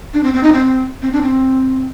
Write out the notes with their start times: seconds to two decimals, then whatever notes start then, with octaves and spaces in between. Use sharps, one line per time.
0.14 D4
0.23 C4
0.34 C4
0.43 D#4
0.53 C4
1.02 C4
1.13 D4
1.22 C4